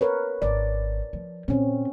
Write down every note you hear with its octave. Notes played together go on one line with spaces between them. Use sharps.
A#4 B4 C#5
G#1 D5
F3
A#2 D3 C4 C#4